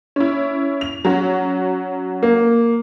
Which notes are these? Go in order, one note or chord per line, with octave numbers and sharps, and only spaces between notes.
C#4 E4
F7
F#3 C#4 F#4
A#3